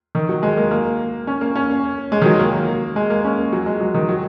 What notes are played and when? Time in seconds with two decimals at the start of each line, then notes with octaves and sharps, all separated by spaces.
0.15 D#3
0.29 F#3
0.43 G#3
0.57 A#3
0.71 A#3
1.27 C#4
1.41 A#3
1.55 C#4
2.12 G#3
2.22 D#3
2.26 F#3
2.40 A#3
2.96 G#3
3.10 A#3
3.24 C#4
3.53 F#3
3.66 G#3
3.81 F#3
3.94 D#3
4.09 F#3